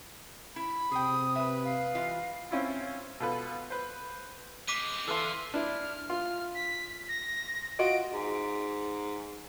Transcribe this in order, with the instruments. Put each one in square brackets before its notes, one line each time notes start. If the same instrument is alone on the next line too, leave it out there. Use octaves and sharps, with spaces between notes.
[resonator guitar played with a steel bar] E4 [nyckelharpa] B5
[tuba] C3 [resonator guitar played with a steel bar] G#4 G5 [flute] D#6
[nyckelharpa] B4 [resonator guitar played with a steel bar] E5
[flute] F5
[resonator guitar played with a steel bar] E3 F4 D#5
[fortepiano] C4 C#4 E4 F4
B2 F4 A4 B4
B4 C5
[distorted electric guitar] G#3 C4 [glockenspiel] D6 B6 D#7
[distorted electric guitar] D3 [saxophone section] E3 A4 [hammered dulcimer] F5 C6
[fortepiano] D4 E4 [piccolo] F6
[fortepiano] F4 [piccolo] F6
[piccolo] B6
A#6
[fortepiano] F4 F#4 D#5 [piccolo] D7
[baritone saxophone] G#2